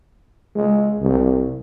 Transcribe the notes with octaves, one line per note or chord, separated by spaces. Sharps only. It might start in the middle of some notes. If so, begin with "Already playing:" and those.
G#3
C2